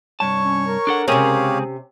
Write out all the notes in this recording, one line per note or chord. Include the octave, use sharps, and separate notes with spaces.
C2 G2 C#5 A5 C#6
C#4
A#4
D4 A4 F#5
C#2 C3 C4 C#4 G4 G#4 C#5 F5